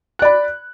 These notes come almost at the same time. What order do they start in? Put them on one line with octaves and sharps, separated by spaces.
F#6 D5 B5